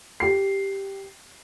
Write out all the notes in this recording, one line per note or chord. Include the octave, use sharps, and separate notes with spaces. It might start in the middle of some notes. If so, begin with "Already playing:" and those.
G4 C7